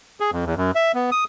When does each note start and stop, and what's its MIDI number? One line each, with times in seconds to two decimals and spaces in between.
0.20 0.31 68
0.32 0.45 41
0.45 0.55 40
0.57 0.71 42
0.75 0.92 76
0.94 1.10 59
1.12 1.24 87